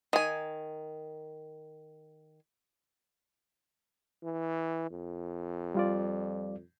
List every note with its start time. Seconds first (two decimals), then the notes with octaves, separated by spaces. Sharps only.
0.13 D#3 G#5
4.23 E3
4.91 F2
5.75 G3 F4 D5